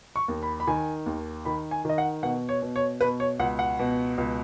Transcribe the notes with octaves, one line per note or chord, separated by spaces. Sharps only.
C#6
D#2
B5
B5
D#3 G#5
D#2
D#3 B5
G#5
D#3 D#5
F#5
B2 F#5
C#5
B2
C#5
B2 B4
C#5
C#2 F#5
F#5
B2
C#2